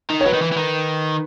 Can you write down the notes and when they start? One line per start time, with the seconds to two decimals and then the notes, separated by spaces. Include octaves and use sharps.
0.10 D#3
0.21 C#5
0.26 F#3 B4
0.33 D#3
0.42 E3
0.52 E3
0.57 D#3